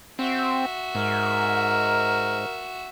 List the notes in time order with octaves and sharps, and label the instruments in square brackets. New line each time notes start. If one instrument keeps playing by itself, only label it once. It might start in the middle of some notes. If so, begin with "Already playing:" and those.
[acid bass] C4 [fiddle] F#4 E5
[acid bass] G#2 [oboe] A#4